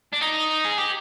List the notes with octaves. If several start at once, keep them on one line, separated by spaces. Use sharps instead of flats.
D4
D#4
G#4
G4